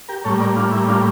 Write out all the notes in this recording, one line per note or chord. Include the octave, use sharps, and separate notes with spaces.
G4 A#4
A2 G3 A#3 A4 C#5
A#4 D5
D4 F4
E4
D4 F4